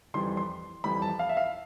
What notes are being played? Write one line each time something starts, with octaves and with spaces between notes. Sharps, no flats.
F2 E3 G3 C6
C6
F2 E3 G3 B5
A5
F5
E5
F5